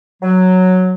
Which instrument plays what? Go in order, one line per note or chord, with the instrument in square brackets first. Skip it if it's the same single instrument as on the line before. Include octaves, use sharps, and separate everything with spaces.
[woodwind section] F#3